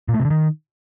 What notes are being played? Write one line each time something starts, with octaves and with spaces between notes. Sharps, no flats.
A#2
A3
C3
D3
D#3